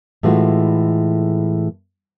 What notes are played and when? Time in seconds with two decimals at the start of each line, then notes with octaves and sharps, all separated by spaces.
0.23 A2 E3 G#3 A3 F4 F#4